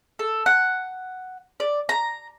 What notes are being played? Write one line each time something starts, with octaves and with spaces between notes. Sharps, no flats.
A4
F#5
D5
A#5